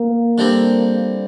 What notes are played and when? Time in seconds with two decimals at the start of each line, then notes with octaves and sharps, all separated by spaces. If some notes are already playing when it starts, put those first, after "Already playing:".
Already playing: A#3
0.38 D3 G3 C4